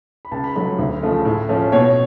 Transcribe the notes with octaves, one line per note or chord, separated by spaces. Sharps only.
B5
C#2 A5
B5
C#3 F#3 A3 B5
D2
C#3 F3 A3
A2
F3 A3 C#4
B2 C#5